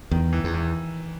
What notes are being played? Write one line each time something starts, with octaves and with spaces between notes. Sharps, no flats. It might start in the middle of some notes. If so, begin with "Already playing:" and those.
E2 D#3
E3
E2
E3